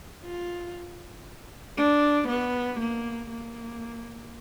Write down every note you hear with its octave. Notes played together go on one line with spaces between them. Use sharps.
F4
D4
B3
A#3
A#3